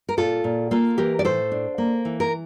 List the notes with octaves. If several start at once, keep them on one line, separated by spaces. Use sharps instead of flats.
A#4
A#2 F4 A4
A#2
A#3 F4 A4
E3 G4 A#4
D5
A2 A4 C5
D4
A#3
E3
A#4